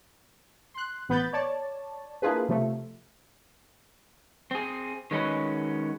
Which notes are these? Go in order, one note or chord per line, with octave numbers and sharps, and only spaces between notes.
C6 F#6
A1 B3 B5 G6 A6
C#5 D5 A5
A#3 D4 E4 F4 G#4 B4
C3 F3 A3
C4 G#4
D#3 G#3 C#4 F#4 B4